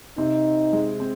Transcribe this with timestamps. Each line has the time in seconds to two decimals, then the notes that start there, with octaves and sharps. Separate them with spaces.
0.18 C3 C4 D#4
0.73 G#3
1.00 C4